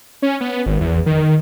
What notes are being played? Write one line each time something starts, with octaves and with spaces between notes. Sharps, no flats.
C#4
B3
G#1
E2
D#3